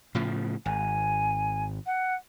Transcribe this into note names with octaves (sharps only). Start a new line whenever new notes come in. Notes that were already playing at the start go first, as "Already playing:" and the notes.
A2 C#3 F3
G#1 G#5
F#5